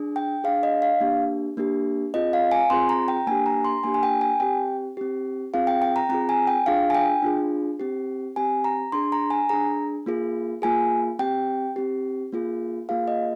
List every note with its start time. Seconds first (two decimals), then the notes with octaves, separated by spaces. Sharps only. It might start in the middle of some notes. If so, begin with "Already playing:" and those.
Already playing: D4 G#4
0.16 G5
0.44 G#4 F5
0.48 D4
0.63 D#5
0.82 F5
1.01 A#3 D4 G4
1.57 A#3 D4 G4
2.14 C4 F4 G#4 D#5
2.33 F5
2.52 G#5
2.70 C4 F4 G#4 C6
2.89 A#5
3.08 G5
3.27 A#3 D4 G4 G#5
3.46 A#5
3.65 C6
3.83 A#3 D4 G4 G#5
3.94 G#5
4.03 G5
4.21 G#5
4.40 C4 G4 G5
4.97 C4 G4
5.54 C4 F4 G#4 F5
5.67 G5
5.82 G5
5.96 A#5
6.09 C4 F4 G#4 A#5
6.29 G#5
6.47 G5
6.66 D4 F4 G#4 F5
6.90 G#5
6.95 G5
7.23 D4 F4 G#4
7.80 C4 G4
8.36 C4 G4 G#5
8.64 A#5
8.92 D4 G#4 C6
9.12 A#5
9.30 G#5
9.49 D4 G#4 A#5
10.06 A#3 F4 G#4
10.62 A#3 F4 G#4 G#5
11.19 C4 G4 G5
11.76 C4 G4
12.32 A#3 F4 G#4
12.89 A#3 F4 G#4 F5
13.08 D#5